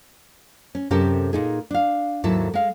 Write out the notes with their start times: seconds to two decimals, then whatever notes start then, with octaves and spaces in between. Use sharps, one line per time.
0.75 C#4
0.91 F#2 C3 C#4 G4 A4 A#4
1.33 A#2 D#4 G#4
1.71 D4 F5
2.24 D#2 G#2 F#3 E4 A4 E5
2.54 G#3 F5